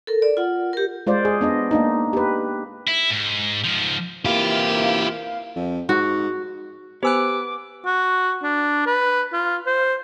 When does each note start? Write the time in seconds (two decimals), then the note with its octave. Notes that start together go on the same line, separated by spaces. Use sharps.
0.07 A4 A#4
0.22 D5
0.37 F4 F#5
0.73 G4 A#4
1.07 G#3 F4 C5 D5
1.25 G#4
1.41 B3 D4 D#5
1.71 A#3 D4 D#4
2.13 G4 B4
2.87 E4
3.10 G#2
3.64 G#2 F3
4.25 C3 E3 A#3 E4 F4 G4 F5
5.56 F2
5.89 G#2 F#4
7.03 B3 G4 C5 G#5 D6 E6 F#6
7.86 F#4
8.43 D4
8.86 B4
9.33 F4
9.67 C5